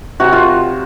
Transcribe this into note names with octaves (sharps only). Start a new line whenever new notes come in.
C3 F#3 F#4
F4